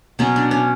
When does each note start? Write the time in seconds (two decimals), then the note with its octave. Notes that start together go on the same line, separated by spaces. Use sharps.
0.19 B2 F#3 B3 C#4
0.36 D4
0.51 C#4